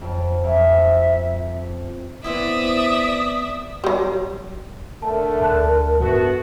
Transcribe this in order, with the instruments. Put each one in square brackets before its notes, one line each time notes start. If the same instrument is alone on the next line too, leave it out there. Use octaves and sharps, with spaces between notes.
[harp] F2
[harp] F2 [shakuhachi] E5
[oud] B3 C4 E4 [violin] D5 E5 [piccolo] D#6
[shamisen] F#3 G3
[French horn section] D3 A3 [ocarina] A#4 [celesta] A5
[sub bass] D2 [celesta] A5 F#6
[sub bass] G2 [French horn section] A3 B3 F#4